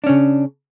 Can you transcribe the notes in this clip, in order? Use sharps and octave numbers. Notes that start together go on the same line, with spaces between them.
C#3 C#4 D4